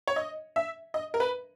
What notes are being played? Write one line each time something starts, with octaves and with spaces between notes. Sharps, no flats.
C#5
D#5
E5
D#5
A#4
B4